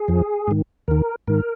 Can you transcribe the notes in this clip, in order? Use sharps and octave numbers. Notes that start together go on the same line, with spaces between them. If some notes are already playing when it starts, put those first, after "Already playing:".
Already playing: G#4
F2 F3
G#2 D#3
D#2 D#3 A#4
G#2 D#3 A#4